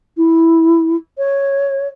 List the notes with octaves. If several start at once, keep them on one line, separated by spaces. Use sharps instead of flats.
E4
C#5